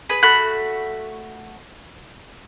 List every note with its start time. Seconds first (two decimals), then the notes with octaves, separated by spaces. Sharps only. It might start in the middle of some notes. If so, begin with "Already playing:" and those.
0.09 G#4 B4 B5
0.23 A3 F#4 B5 F#6